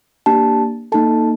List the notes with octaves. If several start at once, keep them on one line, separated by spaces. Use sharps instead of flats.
A#3 D4 G4 A5
A#3 D#4 A4 A5